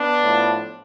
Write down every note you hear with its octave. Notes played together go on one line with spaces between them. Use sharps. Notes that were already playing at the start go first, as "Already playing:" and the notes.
Already playing: B3 D4
A2 F3